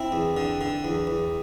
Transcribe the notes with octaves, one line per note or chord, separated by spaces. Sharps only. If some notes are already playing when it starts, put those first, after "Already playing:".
Already playing: C4 E4
E2
D3
D3
E2
E2